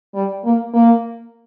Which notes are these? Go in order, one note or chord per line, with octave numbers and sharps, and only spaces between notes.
G3
A#3
A#3